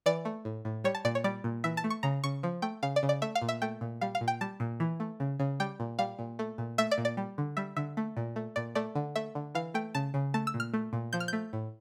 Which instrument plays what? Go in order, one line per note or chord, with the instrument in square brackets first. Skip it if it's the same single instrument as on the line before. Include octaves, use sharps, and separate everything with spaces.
[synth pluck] E3 D5
A3
A2
A2
G3 C#5
A5
A#2 D5
C#5
G3 D5
A#2
E3 E5
A5
A3
C#6
C#3 A#5
C#3 C#6
F3
A3 G5
C#3 F5
D5
C#3
D5
A3 E5
F5
A#2
E5
A3 G5
A#2
G3 F5
F5
A#2
G5
G3 A5
A#2
E3
A3
C#3
C#3
G3 G5
A#2
G3 F5
A#2
A3
A#2
A3 E5
D5
A#2
D5
G3
D3
G3 E5
D3 E5
A3
A#2
A3
A#2 D5
A3 D5
D3
A3 E5
D3
E3 F5
A3 G5
C#3 A5
C#3
A3 A5
E6
A#2
F6
A3
A#2
F3 G6
F6
A3 G6
A2